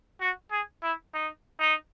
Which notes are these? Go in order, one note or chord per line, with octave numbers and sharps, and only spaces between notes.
F#4
G#4
E4
D#4
D#4